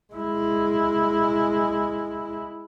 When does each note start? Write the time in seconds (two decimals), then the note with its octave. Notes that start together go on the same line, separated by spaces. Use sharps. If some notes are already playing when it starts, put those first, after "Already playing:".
0.14 G#3 E4